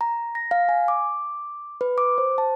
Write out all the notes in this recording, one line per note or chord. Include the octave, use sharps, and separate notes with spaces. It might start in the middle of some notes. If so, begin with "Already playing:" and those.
A#5
A#6
F5
G#5
D6
B4
D6
C5
A5